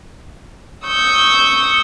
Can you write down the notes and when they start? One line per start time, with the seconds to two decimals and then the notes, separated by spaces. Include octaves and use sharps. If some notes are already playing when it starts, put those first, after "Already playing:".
0.86 C#6 D#6 E6 G6